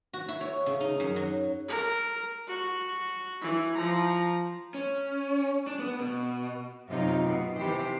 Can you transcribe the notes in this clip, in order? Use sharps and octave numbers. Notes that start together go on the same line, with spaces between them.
F#4
E4
C#5
C#3
D#4
F#2
F#3
A#4
F#4
E3
F3 A#5
C#4
D4
B3
B2
F#2 C3 D#4 F4
B2
C3 E3 G4 C5